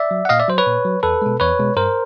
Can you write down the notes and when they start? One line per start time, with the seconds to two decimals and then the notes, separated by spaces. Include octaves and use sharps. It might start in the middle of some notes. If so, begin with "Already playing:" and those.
Already playing: D5 E5
0.11 F#3
0.25 F#5
0.29 A#2 D#5 F5
0.40 D5 E5
0.48 F#3 C5
0.58 B4 C#5
0.66 A#2
0.85 F#3
1.03 E2 A4 B4
1.22 B2 G#3
1.40 E2 B4 C#5
1.59 B2 G#3
1.76 G2 A#4 C5